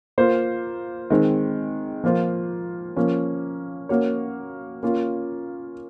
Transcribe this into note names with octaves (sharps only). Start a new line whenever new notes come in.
A#3 F4 C5
D#3 G#3 C4
F3 A#3 F4 C5
F3 A#3 C#4
A#3 C#4 F#4 C#5
A#3 C#4 F4